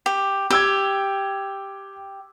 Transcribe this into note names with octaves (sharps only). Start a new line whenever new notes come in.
G4
G4 G5 E6 G#6